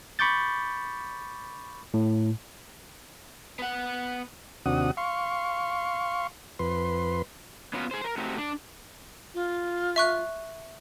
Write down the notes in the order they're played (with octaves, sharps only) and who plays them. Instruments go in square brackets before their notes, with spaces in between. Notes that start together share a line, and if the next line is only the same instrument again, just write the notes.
[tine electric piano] B5 C#6 D6 G6 A6
A2
[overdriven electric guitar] B3 F#5
[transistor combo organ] D#2 C3 D4 F#4 F#5 D#6
F5 C6 C#6
F2 B4 C6
[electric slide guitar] B3 C#4 F4 F#4 A4 B4
G#4 C5
A#4
A3 C4 D#4 F#4 G4
D4 D5
[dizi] F4
[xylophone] E5 C#6 F#6